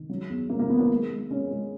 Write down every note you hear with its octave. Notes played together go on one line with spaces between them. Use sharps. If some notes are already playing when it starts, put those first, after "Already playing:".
Already playing: D#3
F#3
E2
F#3 A#3
A#3
D#3 B3
A#3
G#3
G#3
G#3 C#4
G#3